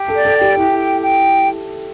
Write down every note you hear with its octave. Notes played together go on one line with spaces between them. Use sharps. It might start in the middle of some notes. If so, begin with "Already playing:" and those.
Already playing: G4
A4
D5
A4
G5
G4
E4 G4
G5
G5